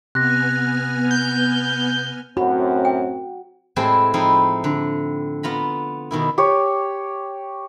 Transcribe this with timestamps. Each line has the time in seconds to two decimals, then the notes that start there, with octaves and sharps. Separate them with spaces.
0.15 C3 B3 G#5 F6 F#6 A#6
1.11 G6
2.37 F#2 A2 C4 F#4 B5
2.85 G5
3.76 A2 G#3 C4 E4 G4 A5
4.14 F3 C4 D#4 E4
4.64 D3
5.43 B3 F4 A#5 B5
6.11 B2 D#3 E4
6.38 G4 C#5